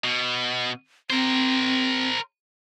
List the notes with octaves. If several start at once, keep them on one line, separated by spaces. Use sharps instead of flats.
B2
C4 A#4 C5